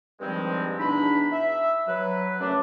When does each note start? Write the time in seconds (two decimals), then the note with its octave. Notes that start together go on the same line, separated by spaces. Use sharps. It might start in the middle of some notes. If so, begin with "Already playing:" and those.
0.21 G2 D#3 F3 G3 G#3 C4
0.80 E2 B2 D4 D#4 B5
1.32 E5
1.88 F#3 B4
2.40 F#2 C#3 A3 C#4 D4